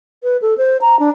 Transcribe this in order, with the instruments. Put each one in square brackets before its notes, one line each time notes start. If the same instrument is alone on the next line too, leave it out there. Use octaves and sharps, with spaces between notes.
[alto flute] B4
A4
C5
A#5
D4